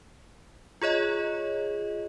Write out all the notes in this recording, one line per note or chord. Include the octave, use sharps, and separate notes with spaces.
F4 G#4 C#5 D#5